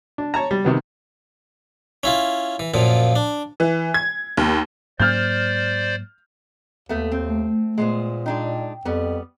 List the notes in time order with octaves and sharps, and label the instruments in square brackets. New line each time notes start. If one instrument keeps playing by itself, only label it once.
[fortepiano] D4
C#5 A5 A#5
G3
C3 D#3 B3
[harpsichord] C#4 E4 F4
E3
F#2 A#2 F3
D4
[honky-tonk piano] E3
G#6
D#2
[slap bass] G#2 F#3 A#3 [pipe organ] C5 D5 [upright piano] F6 G6
[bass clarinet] D#2 [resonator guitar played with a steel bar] A3 B3
[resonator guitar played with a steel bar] C4
[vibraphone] A3
[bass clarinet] A#2 [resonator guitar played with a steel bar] G#3 B3 C5
[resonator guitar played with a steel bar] G#3 D4 D#4 [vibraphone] G5
[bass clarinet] F2 [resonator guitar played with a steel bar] G3 B3